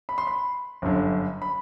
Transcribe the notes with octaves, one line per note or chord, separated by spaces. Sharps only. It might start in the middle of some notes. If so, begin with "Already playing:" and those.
B5
C6
B5
G1 F#2 D3
B5